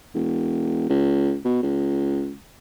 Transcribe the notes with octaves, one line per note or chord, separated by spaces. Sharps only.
E1
C#2
B2
C#2